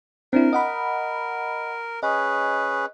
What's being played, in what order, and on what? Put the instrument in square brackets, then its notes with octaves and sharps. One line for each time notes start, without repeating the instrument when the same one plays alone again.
[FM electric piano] C4 D4 E4 [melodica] A#4
[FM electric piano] D#5 F#5 B5
[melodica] C#4 G#4 B4 [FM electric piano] D#5